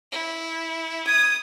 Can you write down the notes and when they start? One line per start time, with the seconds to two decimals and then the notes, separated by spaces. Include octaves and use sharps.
0.12 E4
1.07 D#6 G#6